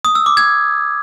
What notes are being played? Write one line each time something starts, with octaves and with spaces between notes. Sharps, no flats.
D#6
E6
D6
G#6